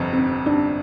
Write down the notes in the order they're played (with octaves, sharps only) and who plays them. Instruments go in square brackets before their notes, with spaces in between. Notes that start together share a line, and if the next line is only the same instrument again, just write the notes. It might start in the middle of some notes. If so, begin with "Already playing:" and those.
Already playing: [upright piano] G1 F2 C3
[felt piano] C4
D4